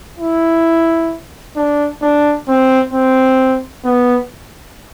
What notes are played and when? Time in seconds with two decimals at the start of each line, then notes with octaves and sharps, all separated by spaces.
0.19 E4
1.56 D4
2.02 D4
2.48 C4
2.94 C4
3.85 B3